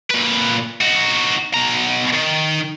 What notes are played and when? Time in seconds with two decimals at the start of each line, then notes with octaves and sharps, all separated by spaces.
0.10 A#2 B4
0.81 D#4 F#4
1.54 B2 A#5
2.13 D#3